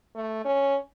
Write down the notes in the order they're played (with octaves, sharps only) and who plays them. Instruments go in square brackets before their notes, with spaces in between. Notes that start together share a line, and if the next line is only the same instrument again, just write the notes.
[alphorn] A3
C#4